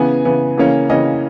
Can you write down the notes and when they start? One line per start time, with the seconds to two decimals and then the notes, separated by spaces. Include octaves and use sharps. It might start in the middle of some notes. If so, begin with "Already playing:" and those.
Already playing: C#3 E3 B3 G#5
0.25 C#3 E3 B3
0.57 C#3 E3 A#3 C#4
0.90 C#3 E3 A#3 C#4 D#5